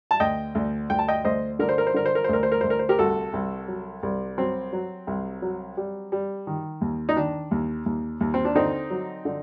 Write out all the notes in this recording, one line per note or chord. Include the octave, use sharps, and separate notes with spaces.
A5
D2 D#5 G5
D2
D2 G5
A5
D#5 G5
D2 C5 D#5
D3 A#4
C5
A#4
C5
D3 A#4
C5
A#4
C5
D2 A#4
C5
A#4
D2 C5
A#4
C5
G4 A#4
C2 F#4 A4
C2
F#3
C2
F#3 C4
F#3
C2
F#3
G3
G3
D#3
D#2
D#4
D#3 D4
D#2
D#2
D#2
C4
D4
D3 C4 D#4
F#3
D3